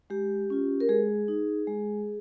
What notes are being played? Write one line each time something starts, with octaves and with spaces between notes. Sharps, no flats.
G#3 G4
C#4 F4
A#4
G#3 G#4
D#4
G#3